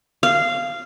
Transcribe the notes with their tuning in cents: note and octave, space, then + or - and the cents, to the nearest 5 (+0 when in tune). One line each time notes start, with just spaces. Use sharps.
F5 -15